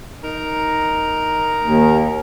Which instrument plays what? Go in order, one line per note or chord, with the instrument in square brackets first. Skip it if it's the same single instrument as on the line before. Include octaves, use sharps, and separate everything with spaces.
[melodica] D#4 A#4 A#5
[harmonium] D#2